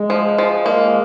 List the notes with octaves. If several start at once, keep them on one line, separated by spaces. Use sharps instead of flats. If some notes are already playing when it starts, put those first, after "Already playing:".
Already playing: G#3
F3
F3
A#3